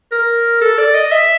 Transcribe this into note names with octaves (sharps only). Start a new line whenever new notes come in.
A#4
A4
D5
D#5
E5